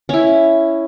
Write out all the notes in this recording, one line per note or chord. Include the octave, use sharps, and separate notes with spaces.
C#4 E4